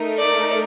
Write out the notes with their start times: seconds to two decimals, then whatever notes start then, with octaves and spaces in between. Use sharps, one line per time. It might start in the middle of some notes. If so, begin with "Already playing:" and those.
Already playing: A3 D#4 A#4
0.19 D5